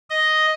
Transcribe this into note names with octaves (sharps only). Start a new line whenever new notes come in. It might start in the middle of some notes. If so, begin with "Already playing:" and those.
D#5